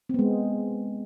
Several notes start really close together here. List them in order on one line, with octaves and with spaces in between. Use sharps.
C4 B3 G#3